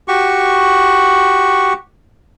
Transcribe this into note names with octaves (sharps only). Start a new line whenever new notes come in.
F#4 G4 C#6